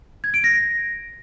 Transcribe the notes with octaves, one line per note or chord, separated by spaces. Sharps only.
G#6
D7
A#6